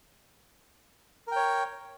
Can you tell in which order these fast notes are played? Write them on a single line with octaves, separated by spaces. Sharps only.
A#4 G5 C#5